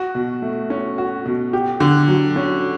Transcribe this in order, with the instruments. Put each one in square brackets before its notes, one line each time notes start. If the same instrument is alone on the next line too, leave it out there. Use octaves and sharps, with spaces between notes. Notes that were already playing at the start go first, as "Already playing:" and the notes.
Already playing: [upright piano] F#4
B2
A3
C#4
F#4
B2
G4
D3
F#3
C#4